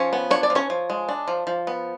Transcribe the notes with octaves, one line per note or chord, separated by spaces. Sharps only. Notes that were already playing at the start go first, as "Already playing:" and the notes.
Already playing: F3 C#4 C#5
B3
D4 C#5
D5
F3
C#4 C#5
F3
G#3
D4
F3
F3
B3